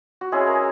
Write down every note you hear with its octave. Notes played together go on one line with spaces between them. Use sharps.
F#4
G#3 C#4 E4 G#4
A#4